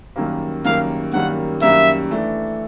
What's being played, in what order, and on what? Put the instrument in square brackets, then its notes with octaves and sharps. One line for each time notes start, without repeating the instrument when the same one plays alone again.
[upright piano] F#2 D#3 G3 A#3
[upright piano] F#2 D#3 G3 A#3 [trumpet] F5
[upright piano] F#2 D#3 G3 A#3 [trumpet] F#5
[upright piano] F#2 D#3 G3 A#3 [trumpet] E5
[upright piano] E3 A3 D4